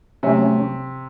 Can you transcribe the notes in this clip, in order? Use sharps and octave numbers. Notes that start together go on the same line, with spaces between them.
C3 F#3 A3 C#4